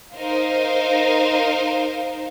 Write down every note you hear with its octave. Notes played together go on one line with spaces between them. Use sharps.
D#4 A#4 C5 F5